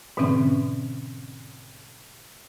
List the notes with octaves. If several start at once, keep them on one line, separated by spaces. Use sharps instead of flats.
G#2 B2 D3 E3 C4 C#4